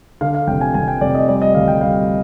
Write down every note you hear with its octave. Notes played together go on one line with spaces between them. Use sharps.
D3 F5
F5
F1 G5
G#5
F1 G#5
G5
F1 D5
D#5
G3 D5
D#5
D2 F5
G5
G3 F5